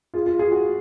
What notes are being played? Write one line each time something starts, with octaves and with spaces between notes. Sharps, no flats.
F4 G#4
F4
F4 G#4
F#4